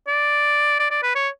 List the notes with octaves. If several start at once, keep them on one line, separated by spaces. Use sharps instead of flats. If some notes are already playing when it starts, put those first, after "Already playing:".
D5
D5
D5
B4
C#5